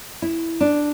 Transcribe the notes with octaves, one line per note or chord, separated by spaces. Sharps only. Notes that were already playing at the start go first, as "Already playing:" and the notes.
E4
D4